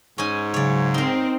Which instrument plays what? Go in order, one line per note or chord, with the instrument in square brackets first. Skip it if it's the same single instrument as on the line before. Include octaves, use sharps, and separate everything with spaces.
[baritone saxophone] G#2 [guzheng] C#4 D#4 G#5
[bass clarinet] C#3 [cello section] F#3 [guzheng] C#5 D5
[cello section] C4 [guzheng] D#4 A#4